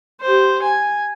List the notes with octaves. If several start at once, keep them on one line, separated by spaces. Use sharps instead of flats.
G4 C5
G#5